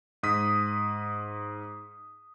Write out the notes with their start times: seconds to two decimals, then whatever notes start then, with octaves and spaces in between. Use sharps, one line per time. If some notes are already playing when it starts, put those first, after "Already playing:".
0.23 G#2 D#6 B6